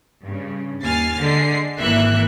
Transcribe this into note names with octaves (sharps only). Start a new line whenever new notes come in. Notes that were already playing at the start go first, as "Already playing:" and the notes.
G2 C#3
D#2 G#5 F6 A6 C7
D3 G#3 C7
G#1 E3 A#3 E5 F#6